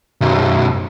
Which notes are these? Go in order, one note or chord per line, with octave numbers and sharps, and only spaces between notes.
B1 F#2